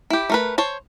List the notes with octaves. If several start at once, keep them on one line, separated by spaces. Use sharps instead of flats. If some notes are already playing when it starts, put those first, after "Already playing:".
E4 G4
A3 A#4 B4
C5 C#5 A5